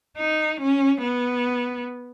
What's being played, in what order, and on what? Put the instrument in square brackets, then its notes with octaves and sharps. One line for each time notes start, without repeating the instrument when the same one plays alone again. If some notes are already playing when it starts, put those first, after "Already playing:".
[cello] D#4
C#4
B3